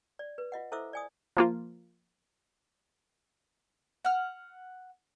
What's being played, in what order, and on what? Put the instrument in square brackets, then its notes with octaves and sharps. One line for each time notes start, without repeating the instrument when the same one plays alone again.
[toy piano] D5
B4
F4 D#5 F#5
E4 A4 C5 E5 D6 E6
D5 G#5 D#6
[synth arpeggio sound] F3 A#3 F4
[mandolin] F#5 F6